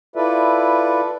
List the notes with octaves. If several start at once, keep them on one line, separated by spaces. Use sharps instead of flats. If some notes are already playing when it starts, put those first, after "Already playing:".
E4 F4 A4 B4 D5 E5